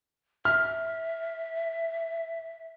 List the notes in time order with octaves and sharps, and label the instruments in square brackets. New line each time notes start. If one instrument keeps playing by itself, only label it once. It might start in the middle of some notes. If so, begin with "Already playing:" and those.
[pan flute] E5 [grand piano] F6